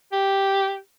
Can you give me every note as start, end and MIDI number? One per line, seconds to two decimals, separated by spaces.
0.12 0.77 67